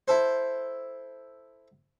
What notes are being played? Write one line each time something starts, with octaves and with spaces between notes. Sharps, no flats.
E4 A4 C5